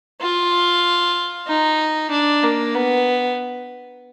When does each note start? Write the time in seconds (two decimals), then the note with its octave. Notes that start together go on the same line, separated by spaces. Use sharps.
0.21 F4
1.48 D#4
2.11 D4
2.43 A#3
2.75 B3